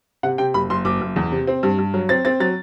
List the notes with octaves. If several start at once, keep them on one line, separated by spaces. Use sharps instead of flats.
C3 F#5
C3 G5
F#1 B5
F#1 C6
F#1 D6
F#1
E2
C3
C4
G2
G2
F#3
C4 A6
C4 A6
F#3 A6